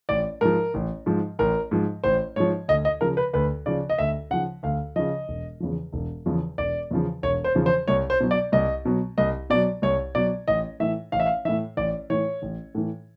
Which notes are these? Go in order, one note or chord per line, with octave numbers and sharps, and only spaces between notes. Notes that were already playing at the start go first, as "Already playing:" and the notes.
A1 D5
G#2 F3 A#4
A1
G#2 F3
A1 A#4
G#2 F3
A1 C5
G#2 F3 C#5
D2 D#5
D#5
C#3 F3 A#4
B4
D2 B4
C#3 F3 D5
D#5
D2 E5
C#3 F3 F#5
D2 F5
C#3 F3 D#5
E1
E2 C#3 F3
E1
E2 C#3 F3
E1 D5
E2 C#3 F3
E1 C#5
C5
E2 C#3 F3
C5
C2 C#5
C5
B2 F#3
D5
C2 D#5
B2 F#3
C2 D#5
B2 F#3 D5
C2 C#5
B2 F#3 D5
A1 D#5
A2 E3 E5
A1 F5
E5
F5
A2 E3 E5
A1 D5
A2 E3 C#5
A1
A2 E3